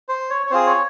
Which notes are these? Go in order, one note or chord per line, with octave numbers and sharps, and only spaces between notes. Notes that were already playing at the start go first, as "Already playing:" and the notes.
C5
C#5
C#5
C4 F4 G#4 C5
C#5